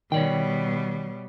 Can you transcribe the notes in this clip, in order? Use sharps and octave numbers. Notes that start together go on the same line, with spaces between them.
B2 D#3 G3 C#5 D5 G5